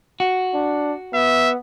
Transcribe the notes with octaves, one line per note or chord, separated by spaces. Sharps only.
F#4
D4
B3 E5